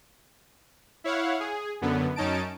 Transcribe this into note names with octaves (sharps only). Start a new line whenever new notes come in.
E4 C#5 F5 F#5
G#4
F#2 D3 B3
F#2 C#4 D#4 A5 D7